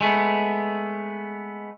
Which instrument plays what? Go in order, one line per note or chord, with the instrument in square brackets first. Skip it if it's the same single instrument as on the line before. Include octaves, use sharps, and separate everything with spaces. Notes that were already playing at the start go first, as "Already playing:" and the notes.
[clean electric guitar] G#3 A3 B3